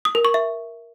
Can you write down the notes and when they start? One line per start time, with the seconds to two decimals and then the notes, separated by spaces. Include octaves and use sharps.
0.05 D#6
0.15 A#4
0.25 C#6
0.34 E5